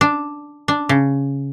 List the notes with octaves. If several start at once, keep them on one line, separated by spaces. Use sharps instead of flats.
D4
D4
C#3